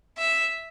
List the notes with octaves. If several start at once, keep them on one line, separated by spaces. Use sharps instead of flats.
E5